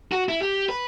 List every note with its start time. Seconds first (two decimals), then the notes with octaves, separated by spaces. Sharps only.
0.12 F#4
0.29 E4
0.42 G4
0.69 B4